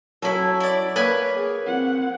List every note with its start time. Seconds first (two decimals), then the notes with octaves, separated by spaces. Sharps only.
0.22 F#3 C#4 E4 A4
0.60 E4 D5
0.96 A#3 B4 C#5 G#5
1.36 G#4
1.65 C4 F#5